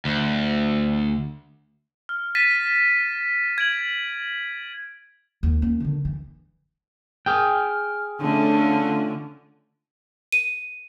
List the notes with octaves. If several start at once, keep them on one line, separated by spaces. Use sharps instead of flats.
D2
F6
A6 B6 D#7 E7
G#6 D7 F#7
D#2
A#3 C#4
D3 D#3
E3
G#4 G5 F6
D3 A3 C#4 D4 F4
D#7